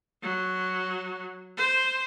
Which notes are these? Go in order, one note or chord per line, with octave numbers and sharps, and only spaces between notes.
F#3
C5